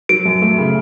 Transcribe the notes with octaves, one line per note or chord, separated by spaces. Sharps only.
F#3 D7
F#2
A3
C#3